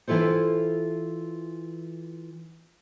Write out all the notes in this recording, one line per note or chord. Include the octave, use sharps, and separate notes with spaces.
E3 E4 F4 A4 C5